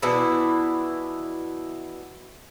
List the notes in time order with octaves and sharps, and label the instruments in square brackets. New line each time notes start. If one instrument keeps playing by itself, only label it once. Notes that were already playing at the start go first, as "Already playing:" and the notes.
[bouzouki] B2 E3 D4 E4